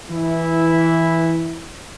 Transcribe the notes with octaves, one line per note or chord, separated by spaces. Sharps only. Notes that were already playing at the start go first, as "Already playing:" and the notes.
E3 E4